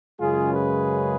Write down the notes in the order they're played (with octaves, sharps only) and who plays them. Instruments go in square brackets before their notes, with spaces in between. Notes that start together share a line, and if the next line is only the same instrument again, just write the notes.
[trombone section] F#2 C#3 G#3 F4 G#4
G#4 B4